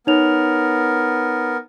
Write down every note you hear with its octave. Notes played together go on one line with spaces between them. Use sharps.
B3 D#4 A#4 C#5 F7